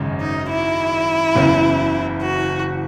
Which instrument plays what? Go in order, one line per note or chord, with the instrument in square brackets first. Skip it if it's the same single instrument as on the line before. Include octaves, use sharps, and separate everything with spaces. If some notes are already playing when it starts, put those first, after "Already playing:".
Already playing: [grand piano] G#1 F#2 C#3 G#3
[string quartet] D#4
E4
[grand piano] F#1 E2 C#3 E3
[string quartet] F#4